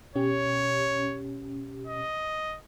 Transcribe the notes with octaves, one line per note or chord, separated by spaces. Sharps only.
B2 C#4 G4 C#5
D#5